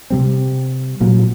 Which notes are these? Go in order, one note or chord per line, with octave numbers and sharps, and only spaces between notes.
C3 G3 C4
A1 A#2 F#3